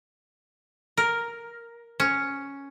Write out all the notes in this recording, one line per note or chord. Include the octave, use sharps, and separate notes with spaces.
A#4
C#4